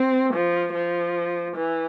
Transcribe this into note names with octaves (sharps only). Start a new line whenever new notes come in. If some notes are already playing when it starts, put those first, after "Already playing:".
Already playing: C4
F3
F3
E3